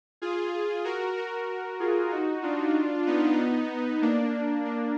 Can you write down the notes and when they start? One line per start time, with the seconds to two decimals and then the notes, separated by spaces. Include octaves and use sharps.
0.22 F4 G#4
0.84 F#4 A#4
1.17 F#4 A#4
1.80 F4 G#4
2.12 D#4 F#4
2.43 D4 F4
3.06 B3 D#4
4.02 A#3 D4
4.65 A#3 D4